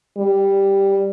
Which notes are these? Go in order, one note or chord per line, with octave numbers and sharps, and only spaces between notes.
G3